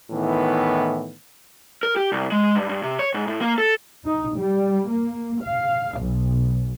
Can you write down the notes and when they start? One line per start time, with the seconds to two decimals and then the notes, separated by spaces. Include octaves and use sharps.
0.10 A2 D#3 E3 B3
1.83 A#4
1.96 G4
2.12 C2
2.32 G#3
2.55 G2
2.69 G2
2.83 C3
2.99 C#5
3.14 G#2
3.27 A2
3.42 A#3
3.58 A4
4.05 D#4
4.37 G3
4.89 A#3
5.41 F5
5.98 B1